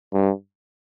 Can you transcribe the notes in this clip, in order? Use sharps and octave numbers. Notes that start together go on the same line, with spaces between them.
G2